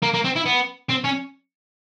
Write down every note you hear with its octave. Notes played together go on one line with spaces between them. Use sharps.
A#3
A#3
C4
E4
B3
C4
C#4